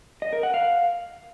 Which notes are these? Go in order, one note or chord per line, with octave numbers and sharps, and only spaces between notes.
D#5
A#4
F#5
F5